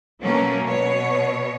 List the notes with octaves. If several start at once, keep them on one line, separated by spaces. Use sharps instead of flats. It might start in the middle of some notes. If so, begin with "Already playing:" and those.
B2 F#3 A3 A#3 C#4
B2 C#5